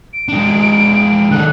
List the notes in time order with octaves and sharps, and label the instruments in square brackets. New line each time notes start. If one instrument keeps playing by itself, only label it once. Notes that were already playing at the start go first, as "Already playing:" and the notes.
[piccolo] D7
[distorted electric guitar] G#3 D4
[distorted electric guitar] D#3 A4 [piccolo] F#6